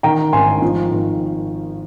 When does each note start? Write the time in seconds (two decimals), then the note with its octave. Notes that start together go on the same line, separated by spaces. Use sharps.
0.03 D#3 G5 A#5
0.33 G#1 G#5 C6
0.62 F3
0.91 G#1